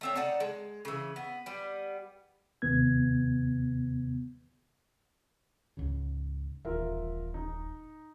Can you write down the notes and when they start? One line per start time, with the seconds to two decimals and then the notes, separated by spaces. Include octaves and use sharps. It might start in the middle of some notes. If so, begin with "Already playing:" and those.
0.01 A3 C4 C#5
0.15 D#4 D5 F#5 A5
0.40 G#3
0.85 C#3 E3
1.16 B3
1.46 G3 B3
2.62 D#2 C3 B3 G#6
5.77 C#2 G#2 C#3
6.65 D#1 A1 F4 A#4 E5
7.34 D#4